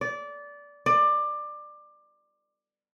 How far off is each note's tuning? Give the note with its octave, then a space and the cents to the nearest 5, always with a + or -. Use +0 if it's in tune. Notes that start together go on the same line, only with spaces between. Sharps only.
D5 -20
D5 +20